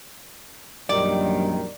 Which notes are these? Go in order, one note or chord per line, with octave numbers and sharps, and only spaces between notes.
A#1 F#2 D#3 G3 D5